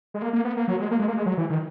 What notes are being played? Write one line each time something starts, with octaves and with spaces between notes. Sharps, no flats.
G#3
A#3
A#3
B3
A#3
F#3
G#3
A#3
G#3
A#3
G#3
F#3
E3
D#3